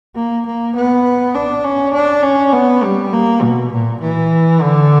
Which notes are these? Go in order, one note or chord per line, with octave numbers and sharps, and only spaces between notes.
A#3
A#3
B3
D4
C#4
D4
C#4
B3
G3
A#3
B2
A#2
E3
D3